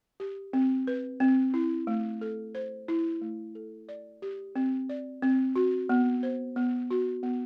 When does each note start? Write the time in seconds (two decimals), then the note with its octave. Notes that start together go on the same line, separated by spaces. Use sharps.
0.20 G4
0.53 C4
0.87 B4
1.20 C4
1.54 E4
1.87 A3
2.21 A4
2.55 C5
2.88 E4
3.21 A3
3.55 A4
3.89 D5
4.22 G4
4.56 C4
4.89 D5
5.22 C4
5.56 F#4
5.89 B3
6.23 C5
6.56 B3
6.91 F#4
7.23 B3